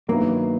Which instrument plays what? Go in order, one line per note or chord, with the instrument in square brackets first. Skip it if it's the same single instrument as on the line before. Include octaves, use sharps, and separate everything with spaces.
[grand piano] G2 D#3 F#3 B3 E4 [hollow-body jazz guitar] A#3